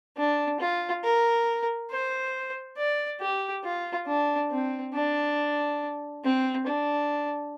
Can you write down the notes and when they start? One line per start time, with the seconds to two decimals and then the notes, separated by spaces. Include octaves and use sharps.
0.17 D4
0.60 F4
1.04 A#4
1.91 C5
2.77 D5
3.21 G4
3.64 F4
4.07 D4
4.51 C4
4.94 D4
6.24 C4
6.67 D4